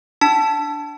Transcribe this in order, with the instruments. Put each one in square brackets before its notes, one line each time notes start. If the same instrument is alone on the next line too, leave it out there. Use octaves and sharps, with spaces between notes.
[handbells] D4 A5